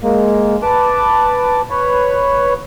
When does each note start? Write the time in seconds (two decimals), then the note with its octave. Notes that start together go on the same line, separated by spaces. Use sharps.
0.03 G#3 A#3
0.62 B4 A5 D6
1.70 B4 C#5